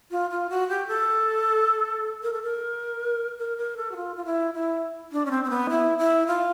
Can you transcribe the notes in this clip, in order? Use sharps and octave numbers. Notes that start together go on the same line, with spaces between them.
F4
F4
F#4
G4
A4
A#4
A4
A#4
A#4
A#4
A4
F#4
F4
F4
E4
E4
D4
C#4
C4
C4
B3
E4
E4
F4